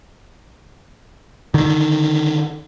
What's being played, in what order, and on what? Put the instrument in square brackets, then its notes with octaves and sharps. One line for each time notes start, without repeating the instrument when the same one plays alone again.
[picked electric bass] D3 D#3